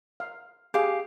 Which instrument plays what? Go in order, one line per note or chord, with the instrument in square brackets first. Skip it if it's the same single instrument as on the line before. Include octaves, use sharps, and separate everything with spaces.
[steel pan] F5
[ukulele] G4 F5 [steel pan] G#4